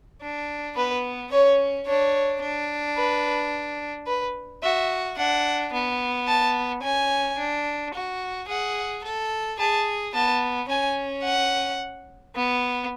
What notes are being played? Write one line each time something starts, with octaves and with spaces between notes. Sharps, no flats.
D4
B3 B4
C#4 C#5
D4 C#5
D4
B4
B4
F#4 E5
D4 F#5
B3
A5
C#4 G#5
D4
F#4
G#4 F#5
A4
G#4 A5
B3 A5
C#4 G#5
F#5
B3